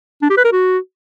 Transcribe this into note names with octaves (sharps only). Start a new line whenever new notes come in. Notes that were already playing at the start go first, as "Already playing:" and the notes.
D4
G4
B4
A#4
F#4